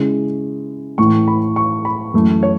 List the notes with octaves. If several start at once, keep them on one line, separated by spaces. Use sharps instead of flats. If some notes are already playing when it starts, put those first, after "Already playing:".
Already playing: C#3 G#3 C#4 E4
A2 E3 A3 C#6
B5
C#6
B5
F#2 E3 A3
C#5